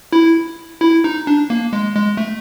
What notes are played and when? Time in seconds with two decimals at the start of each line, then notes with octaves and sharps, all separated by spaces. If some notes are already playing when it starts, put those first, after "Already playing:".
0.13 E4
0.81 E4
1.04 D#4
1.27 D4
1.50 A#3
1.73 G#3
1.95 G#3
2.17 A3